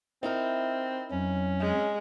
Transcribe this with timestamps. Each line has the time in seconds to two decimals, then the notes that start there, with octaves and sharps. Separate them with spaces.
0.23 C4 D#4 E4 A#4
1.11 F2 F#3 C#4
1.61 G#3